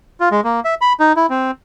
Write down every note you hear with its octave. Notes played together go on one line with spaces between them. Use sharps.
F4
G#3
A#3
E5
B5
D#4
E4
C4